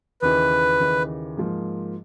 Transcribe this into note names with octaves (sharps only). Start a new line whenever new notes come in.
D#2 C#3 E3 B4
D#2 C#3 E3
G#2 F3 A#3